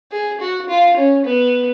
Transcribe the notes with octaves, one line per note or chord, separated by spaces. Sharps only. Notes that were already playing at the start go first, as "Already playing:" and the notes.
G#4
F#4
F4
C#4
B3